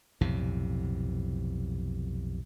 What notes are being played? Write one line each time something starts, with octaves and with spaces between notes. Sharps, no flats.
B1 F2 A2 C3